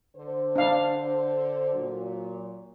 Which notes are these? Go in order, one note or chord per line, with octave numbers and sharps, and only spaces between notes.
D3 C5
D4 F5
A#2 F#3